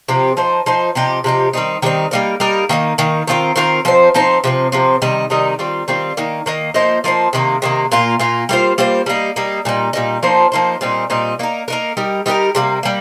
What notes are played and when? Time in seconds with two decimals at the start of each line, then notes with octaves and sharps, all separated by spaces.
0.08 C3 F3 C4 G4
0.37 F3 D#4 C5
0.66 F3 D#4 C5
0.95 C3 F3 D#4 G4
1.24 C3 F3 D#4 G4
1.53 D#3 G3 C4 D#4
1.82 D#3 G3 C4 D#4
2.11 G3 A#3 D#4 A#4
2.40 G3 A#3 D#4 A#4
2.69 D#3 A#3 D#4
2.98 D#3 A#3 D#4
3.27 D#3 C4 F4 A#4
3.56 D#3 C4 F4 A#4
3.85 F3 C4 D#4 C5
4.14 F3 C4 D#4 C5
4.44 C3 F3 C4
4.72 C3 F3 C4
5.02 C3 D#3 G3 D#4
5.30 C3 D#3 G3 D#4
5.59 D#3 G3 C4 F4
5.88 D#3 G3 C4 F4
6.17 D#3 A#3 D#4
6.46 D#3 A#3 D#4
6.74 F3 A#3 D#4 C5
7.04 F3 A#3 D#4 C5
7.33 C3 D#3 A#3
7.62 C3 D#3 A#3
7.92 A#2 A#3 F4
8.19 A#2 A#3 F4
8.49 G3 A#3 F4 C5
8.78 G3 A#3 F4 C5
9.06 G3 A#3 D#4
9.36 G3 A#3 D#4
9.65 A#2 G3 D#4
9.93 A#2 G3 D#4
10.23 F3 A#3 D#4 C5
10.52 F3 A#3 D#4 C5
10.81 A#2 G3 C4 D#4
11.10 A#2 G3 C4 D#4
11.39 A#3 D#4 A#4
11.68 A#3 D#4 A#4
11.97 G3 D#4 G4 A#4
12.26 G3 D#4 G4 A#4
12.55 C3 G3 A#3
12.83 G3 A#3